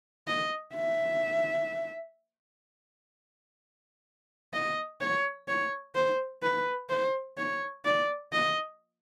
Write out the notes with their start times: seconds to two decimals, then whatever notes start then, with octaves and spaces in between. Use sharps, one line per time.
0.28 D#5
0.74 E5
4.54 D#5
5.01 C#5
5.48 C#5
5.95 C5
6.43 B4
6.90 C5
7.38 C#5
7.85 D5
8.33 D#5